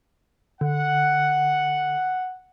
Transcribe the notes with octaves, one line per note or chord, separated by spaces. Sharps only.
D3 F#5